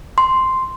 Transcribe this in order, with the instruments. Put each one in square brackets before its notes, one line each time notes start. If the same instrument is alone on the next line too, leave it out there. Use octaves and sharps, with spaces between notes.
[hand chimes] C6